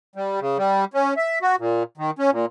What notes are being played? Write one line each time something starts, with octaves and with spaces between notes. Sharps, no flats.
G3
C#3
G3
C#4
E5
F#4
A#2
D#3
C#4
A#2